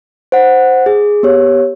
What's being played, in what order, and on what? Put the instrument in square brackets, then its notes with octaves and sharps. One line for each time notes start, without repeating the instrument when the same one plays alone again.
[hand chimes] C5 F#5
G#4
B3 G4 C#5